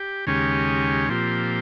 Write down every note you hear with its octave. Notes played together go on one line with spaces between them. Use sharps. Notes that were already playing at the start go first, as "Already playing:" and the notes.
Already playing: G4
D#2 C#3 G#3 C#4 G4
A#2 F3 C4 G4